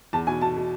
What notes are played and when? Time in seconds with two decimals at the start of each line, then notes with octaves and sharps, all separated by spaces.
0.13 E2 A5
0.27 B2 G#5
0.41 B2 A5
0.56 B2